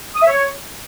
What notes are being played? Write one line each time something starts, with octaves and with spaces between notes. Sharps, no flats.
D#6
E5
C#5